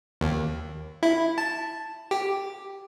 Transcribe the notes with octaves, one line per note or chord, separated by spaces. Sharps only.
D#2
E4
A5
G4